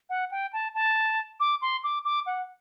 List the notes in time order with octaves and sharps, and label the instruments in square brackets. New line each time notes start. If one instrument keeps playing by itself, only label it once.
[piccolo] F#5
G5
A5
A5
D6
C6
D6
D6
F#5